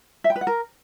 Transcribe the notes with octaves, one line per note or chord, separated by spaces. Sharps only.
E5
G5
B4
F#5
A#4